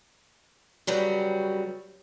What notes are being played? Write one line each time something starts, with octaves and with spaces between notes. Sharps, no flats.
C#3 F#3 G3 B4